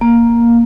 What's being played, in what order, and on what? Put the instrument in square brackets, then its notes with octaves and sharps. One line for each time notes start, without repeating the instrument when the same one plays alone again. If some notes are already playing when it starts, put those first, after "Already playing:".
[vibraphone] A#3